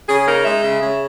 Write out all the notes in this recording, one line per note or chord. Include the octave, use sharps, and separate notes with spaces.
C#3 G#4
D#4 A#4
G#3 E5
C#3
C#3